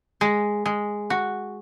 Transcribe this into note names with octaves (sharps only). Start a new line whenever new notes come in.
G#3
G#3
F#4